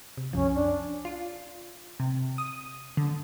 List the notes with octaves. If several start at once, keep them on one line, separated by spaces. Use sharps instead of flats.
C3
C2 F#2 F3 C#4
D4
F4
C3
D#6
D3